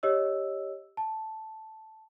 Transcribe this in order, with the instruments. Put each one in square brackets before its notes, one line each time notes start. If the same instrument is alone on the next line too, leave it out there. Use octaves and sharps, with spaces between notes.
[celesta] G4 C#5 D#5 E6
A5